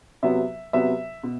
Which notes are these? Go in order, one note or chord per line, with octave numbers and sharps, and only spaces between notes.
C3 F#3 B3 E5
C3 F#3 B3 E5
B2